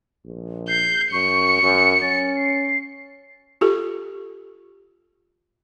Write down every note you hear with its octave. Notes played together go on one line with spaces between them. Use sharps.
A#1
G6 C7
F#2 C#6 C#7
F#2
C#4 A6
C7
F4 G4 A4